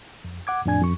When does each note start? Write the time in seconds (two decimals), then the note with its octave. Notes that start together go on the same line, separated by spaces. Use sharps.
0.24 F2
0.47 F#5 D6 G#6
0.66 F2 A2 D4 G#5 G#6
0.81 F2 C#6